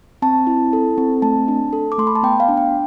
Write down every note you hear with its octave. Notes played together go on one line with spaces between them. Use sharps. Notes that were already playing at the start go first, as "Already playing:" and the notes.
C4 A5
E4
A4
C4
A3 A5
D4
A4
D6
A3 C6
B5
A5
B3 G5
F5
D4
G5